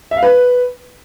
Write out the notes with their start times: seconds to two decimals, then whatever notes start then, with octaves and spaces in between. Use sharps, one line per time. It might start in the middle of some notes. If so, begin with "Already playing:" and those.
0.11 E5
0.17 F5
0.23 B4